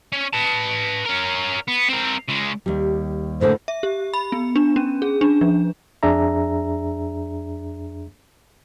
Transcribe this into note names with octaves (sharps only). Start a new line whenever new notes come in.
C#4
B4 A5
C#4 A#4
B3
C4 A#4
C#3 G#3
D#2 G3
A2 D3 A#3 C5
E5
G4
B5
B3
D4
C#4
G#4
D4
F3
F2 D4 G#4 E5 A#5